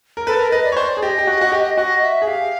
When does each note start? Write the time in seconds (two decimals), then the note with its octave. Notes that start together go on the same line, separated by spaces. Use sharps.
0.17 A#4
0.27 A4 B4
0.39 A#4
0.51 B4 D#5
0.65 D5
0.72 C#5
0.77 C5 D5
0.97 G#4
1.03 G4 D#5
1.18 G4
1.27 F#4
1.41 F#4
1.52 G4
1.77 F#4 D#5
2.03 E5
2.22 G#4
2.27 G4 F5